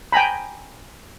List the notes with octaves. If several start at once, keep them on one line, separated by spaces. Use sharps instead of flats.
G5 G#5 A#5 B5